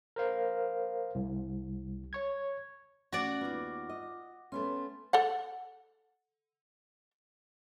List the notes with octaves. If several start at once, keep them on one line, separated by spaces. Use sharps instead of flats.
A#4 C5 F5
C2
C#5 C#6 G#6
A3 C#4 F#4 D5 F#5
D#2 B3 F4 D6
D#5
A3 B3 C#4 C6
A4 D5 F#5